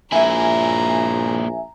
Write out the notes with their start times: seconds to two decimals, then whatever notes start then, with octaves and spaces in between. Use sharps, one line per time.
0.12 A#1 A#2 E4 E5 G#5 A#5